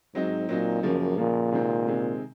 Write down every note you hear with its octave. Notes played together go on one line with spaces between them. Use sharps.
G#2 F#3 C4 D#4
A#2 F#3 C4 D#4
F#2 C#3 F3 A#3
A#2 C#3 F3 A#3
C3 D#3 G#3 C4
C3 D#3 G#3 C4